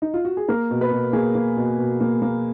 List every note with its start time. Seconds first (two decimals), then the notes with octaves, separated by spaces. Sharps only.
0.02 D#4
0.14 F4
0.25 F#4
0.37 G#4
0.49 A#3 A#4
0.70 B2
0.81 B4
0.91 B2
1.13 A#3 G#4
1.35 A#3
1.57 B2
1.78 B2
2.01 A#3
2.22 A#3